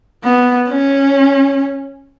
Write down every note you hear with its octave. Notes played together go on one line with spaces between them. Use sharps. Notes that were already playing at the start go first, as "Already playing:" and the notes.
B3
C#4